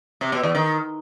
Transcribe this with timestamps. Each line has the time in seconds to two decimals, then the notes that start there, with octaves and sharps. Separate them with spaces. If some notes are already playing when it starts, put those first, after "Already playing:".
0.21 C3
0.32 B2
0.43 E2
0.55 D#3